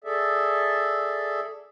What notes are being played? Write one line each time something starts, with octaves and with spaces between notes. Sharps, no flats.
G#4 A4 D5 E5